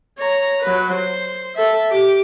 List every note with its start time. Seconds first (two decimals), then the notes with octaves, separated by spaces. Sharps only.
0.19 C#5 A#5
0.62 F#3 B4
0.94 C5
1.56 A4 E5
1.91 G4 D6